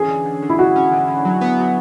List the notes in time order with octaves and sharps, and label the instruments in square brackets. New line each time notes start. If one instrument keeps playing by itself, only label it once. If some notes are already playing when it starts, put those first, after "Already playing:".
Already playing: [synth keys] E3 C#4 [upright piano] G#4
[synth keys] D3
D3
D3
[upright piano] E4
[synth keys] D3 [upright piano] F#4
[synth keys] C#4
D3
D3
F#3
B3
F#3